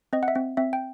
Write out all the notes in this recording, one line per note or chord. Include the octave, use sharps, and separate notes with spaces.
C4 D#5
F#5
E5
C4
C4 E5
G5